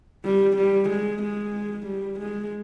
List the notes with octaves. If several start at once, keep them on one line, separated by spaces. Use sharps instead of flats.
G3
G3
G#3
G#3
G3
G#3